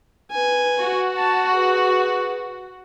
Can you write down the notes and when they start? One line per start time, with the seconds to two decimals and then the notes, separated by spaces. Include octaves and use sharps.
0.31 B4 G#5
0.78 F#4
1.17 A5
1.51 G#4 B4